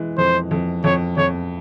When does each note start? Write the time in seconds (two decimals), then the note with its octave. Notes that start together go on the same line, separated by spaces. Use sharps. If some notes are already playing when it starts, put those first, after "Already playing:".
Already playing: E3 G#3
0.18 F2 C5
0.51 F2
0.84 F2 C#5
1.17 F2 C#5